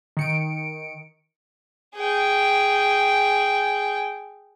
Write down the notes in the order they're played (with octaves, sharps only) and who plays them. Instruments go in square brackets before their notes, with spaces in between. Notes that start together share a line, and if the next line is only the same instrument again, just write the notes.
[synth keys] D#3 C#7 D7
[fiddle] G#4 G5